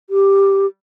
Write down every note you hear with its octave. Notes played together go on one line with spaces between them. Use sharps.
G4